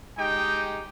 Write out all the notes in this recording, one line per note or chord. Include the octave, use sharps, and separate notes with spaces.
G#3 D#4 G4 G5